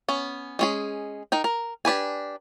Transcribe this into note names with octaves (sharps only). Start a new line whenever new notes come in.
B3 C#4
G#3 C#4 G#4
D#4 A#4 G5
A#4
D4 G4 B4 G#5